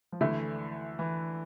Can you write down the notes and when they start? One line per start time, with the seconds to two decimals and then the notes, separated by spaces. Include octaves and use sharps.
0.12 F3
0.21 D2 D3 E3 A3 E4
0.99 E3